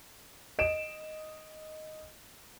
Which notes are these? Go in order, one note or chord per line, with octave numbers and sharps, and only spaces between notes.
D#5 D7 E7